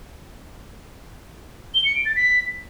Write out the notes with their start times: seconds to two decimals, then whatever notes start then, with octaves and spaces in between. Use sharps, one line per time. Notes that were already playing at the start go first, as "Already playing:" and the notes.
1.75 G7
1.85 C#7
1.95 D7
2.06 A6
2.16 B6